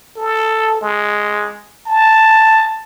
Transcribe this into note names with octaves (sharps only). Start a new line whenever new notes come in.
A4
G#3
A5